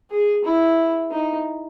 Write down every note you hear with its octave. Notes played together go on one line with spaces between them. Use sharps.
G#4
E4
D#4